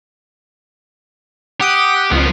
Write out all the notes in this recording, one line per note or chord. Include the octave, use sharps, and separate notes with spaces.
G4 F#5 D#6 D#7
C#2 F3 B3